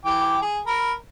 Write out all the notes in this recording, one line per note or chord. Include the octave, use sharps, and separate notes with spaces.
E3 G5 D6
G#4
A#4 B5